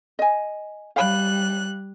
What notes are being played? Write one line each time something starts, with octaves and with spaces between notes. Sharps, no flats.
D#5 G#5
G3 F5 G5 B5 F#6